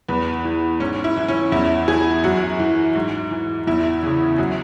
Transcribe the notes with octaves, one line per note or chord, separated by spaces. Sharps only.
E2 B4
E3
G#2 C#4
E4
E3
C#4
E2 E4
E3 G#4
F#2 F#4
E3
G#2
E3
E2 E4
C#3 E3
F#2 F#4